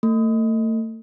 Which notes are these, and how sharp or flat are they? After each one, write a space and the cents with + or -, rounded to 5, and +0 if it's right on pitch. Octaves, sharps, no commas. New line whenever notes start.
A3 +35